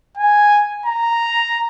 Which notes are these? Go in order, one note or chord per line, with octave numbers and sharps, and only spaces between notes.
G#5
A#5